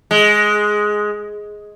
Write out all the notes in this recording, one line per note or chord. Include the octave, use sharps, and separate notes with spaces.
G#3